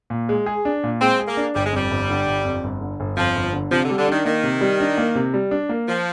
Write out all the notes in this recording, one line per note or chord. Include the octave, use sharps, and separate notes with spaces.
A#2
G#3
G#4
D4
A#2
G#3 C4
G#4
A#3
D4
G1 G3
G#3
F2 G3
G1
D3
G1
F2
G1
D3
G1
F2 F3
G1
D3
C3 F3
D3
G3
D3
D#3 D4
D#3 A#3
C3
G3
D4
A#3
C3
G3
D4
A#3
F3